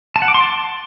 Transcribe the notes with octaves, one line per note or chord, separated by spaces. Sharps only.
A5
F#5
D6
C6
A5